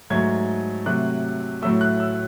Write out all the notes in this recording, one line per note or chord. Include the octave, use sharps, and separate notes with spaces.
G#2 F#3 A3 G#6
C3 F#3 A3 F#6
A2 F#3 A3 E6
F#6
E6